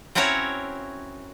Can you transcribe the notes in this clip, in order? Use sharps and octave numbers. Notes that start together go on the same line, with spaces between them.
C4 C#4 E4 F#4 A#4 C#5